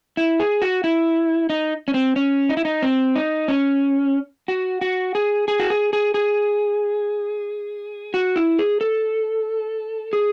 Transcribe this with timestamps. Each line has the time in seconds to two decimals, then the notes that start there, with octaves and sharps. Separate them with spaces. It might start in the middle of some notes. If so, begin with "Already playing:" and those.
0.17 E4
0.40 G#4
0.62 F#4
0.84 E4
1.50 D#4
1.88 C#4
1.94 C4
2.16 C#4
2.49 D#4
2.57 E4
2.65 D#4
2.82 C4
3.16 D#4
3.48 C#4
4.48 F#4
4.81 F#4
5.15 G#4
5.48 G#4
5.59 F#4
5.70 G#4
5.93 G#4
6.14 G#4
8.14 F#4
8.36 E4
8.59 G#4
8.81 A4
10.13 G#4